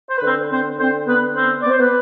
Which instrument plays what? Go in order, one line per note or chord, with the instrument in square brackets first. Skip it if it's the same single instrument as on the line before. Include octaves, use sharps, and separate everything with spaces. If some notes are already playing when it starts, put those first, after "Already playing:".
[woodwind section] C5
B4
D3 C4 C5
D3 C4 C5
D3 C4 C5
D3 B3 B4
B3 C4 C5
B3 D5
C5
B3 B4